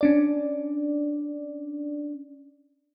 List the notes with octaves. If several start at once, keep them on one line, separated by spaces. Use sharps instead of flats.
C#4 D4 D5